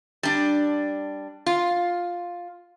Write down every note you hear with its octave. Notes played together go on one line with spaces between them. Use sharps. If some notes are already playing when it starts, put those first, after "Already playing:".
G3 D4
F4